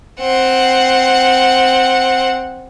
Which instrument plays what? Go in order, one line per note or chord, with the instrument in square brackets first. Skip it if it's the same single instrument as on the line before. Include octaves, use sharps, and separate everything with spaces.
[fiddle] C4 F#5